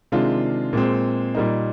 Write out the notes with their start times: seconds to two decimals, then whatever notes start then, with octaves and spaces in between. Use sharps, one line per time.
0.12 C3 D#3 G#3 D4 F4
0.73 A#2 G#3 C4
1.35 A#2 G3 A#3 D#4